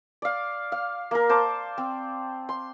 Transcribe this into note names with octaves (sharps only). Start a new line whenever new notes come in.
D5 F5
F5
A#3 A#4
C5 A5 D6
C4
C6